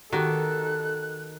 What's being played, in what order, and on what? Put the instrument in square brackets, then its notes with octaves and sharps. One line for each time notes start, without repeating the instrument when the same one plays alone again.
[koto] D#3 [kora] F#4 G4 [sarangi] A4 [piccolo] F#6